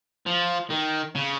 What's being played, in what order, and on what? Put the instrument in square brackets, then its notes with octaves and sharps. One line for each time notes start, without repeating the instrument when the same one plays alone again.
[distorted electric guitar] F3
D#3
C#3